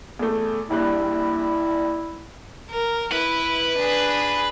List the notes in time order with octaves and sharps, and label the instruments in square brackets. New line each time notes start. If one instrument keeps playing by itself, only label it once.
[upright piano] E2 A3
[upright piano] A#1 G2 F#6 [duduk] E4
[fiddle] A#4
[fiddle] E4 [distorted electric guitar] B4
[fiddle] D4 G#4